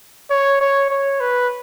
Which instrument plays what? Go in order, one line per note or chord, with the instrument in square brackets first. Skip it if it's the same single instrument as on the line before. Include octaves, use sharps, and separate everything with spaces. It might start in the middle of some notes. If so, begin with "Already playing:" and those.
[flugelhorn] C#5
C#5
C#5
B4